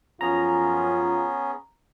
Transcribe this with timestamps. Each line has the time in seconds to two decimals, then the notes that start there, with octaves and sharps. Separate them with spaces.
0.21 F#2 F3 B3 C#4 F4 G#4 A#5